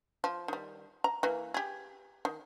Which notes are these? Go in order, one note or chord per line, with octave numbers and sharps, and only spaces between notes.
F3
D#3 G3
A#5
E3 A#3
G4 G#4
D#3